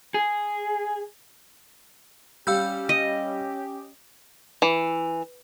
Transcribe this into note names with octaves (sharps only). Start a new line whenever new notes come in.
G#4
G3 C#4 G4 F5 E6 G6
D#5
E3